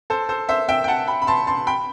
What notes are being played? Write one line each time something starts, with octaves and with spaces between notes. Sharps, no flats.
A4 C5
A4 C5
C5 E5
E5 G5
G5
F#5 A5
G5 B5
B5
A5 C6
A5 C6
G5 B5